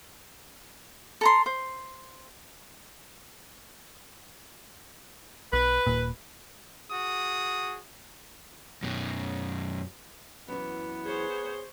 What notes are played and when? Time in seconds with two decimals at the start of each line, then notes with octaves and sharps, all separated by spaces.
1.21 A4 A#5 C6
1.46 C5
5.53 B1 B4
5.87 D#1 A#2
6.91 F#4 G#4 D#6
8.82 F#2 B2
10.48 F#2 E3 B3
11.04 G#4 C5 C#5